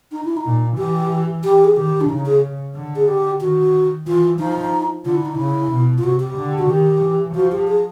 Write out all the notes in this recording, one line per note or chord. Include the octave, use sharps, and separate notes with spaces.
D#4
E4
D#4
A#2
E3 G4
G4
G#4
D#3 G4
D4
C#3 D#4
G#4
D3
G#4
G4
D#3 F#4
E3 F4
F3 D#4
D3 F4
E4
D#4
C#3 E4
B2
F4
C3 F#4
G4
D3
F#4
D#3 G4
E3
F3 F#4
G4
G#4